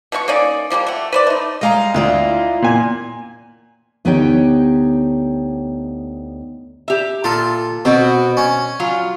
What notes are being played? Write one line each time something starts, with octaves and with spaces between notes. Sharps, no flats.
B2 B3 E4 C#6
A#3 C#4 D#4 D5
F3 G3 G#3 A#3
A3 F#5
B4 C5 D5
A3 D#4
G3 G#3 D#5 F5 A#5
D2 E4 F4 D5
A#2 G#5
D2 B3 D#4 G4 C#5 G5
G4 E5
A#2 F4 A4
B2 C4 F#4
C#4
F#3 F4